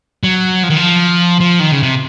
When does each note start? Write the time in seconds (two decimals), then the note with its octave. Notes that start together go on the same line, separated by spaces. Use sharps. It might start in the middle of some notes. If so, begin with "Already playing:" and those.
0.23 F#3
0.63 F3
0.70 D#3
0.77 F3
1.40 F3
1.60 D#3
1.71 C#3
1.83 C3